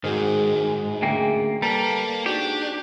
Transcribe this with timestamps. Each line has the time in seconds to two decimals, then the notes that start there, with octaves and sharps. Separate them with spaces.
0.04 G#2 D#3 G#3 F#4 G#4 C5
1.02 D2 C#3 A#3 G#4 E5 G5
1.62 G3 A#3 A4 B4 A#5
2.26 G#2 D4 F#4 G4